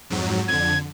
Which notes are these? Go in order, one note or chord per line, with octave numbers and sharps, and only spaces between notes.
F2 G#2 F#3
F2 D3 G#6